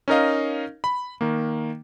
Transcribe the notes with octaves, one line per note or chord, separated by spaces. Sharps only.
C#4 D#4 A#4 D#5 F5
B5
D#3 A#3